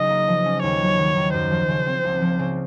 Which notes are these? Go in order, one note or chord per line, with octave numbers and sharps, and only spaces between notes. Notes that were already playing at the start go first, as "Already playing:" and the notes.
Already playing: C#3 F#3 D#4 D#5
A#3
F3
C#4
D#2 C#5
F#3
D#3
D#2
F#2 C5
F3
C#3
C4
C#2
F3
C#3